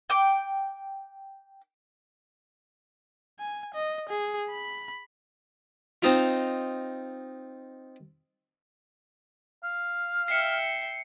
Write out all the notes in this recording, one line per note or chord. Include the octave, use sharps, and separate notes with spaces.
G5 D6
G#5
D#5
G#4
B5
C4 D#4 F4
F5
E5 G5 C7 C#7